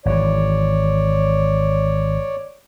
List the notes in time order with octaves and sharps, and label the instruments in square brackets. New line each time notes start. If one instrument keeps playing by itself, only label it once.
[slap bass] G#1 E3 [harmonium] C#5 D5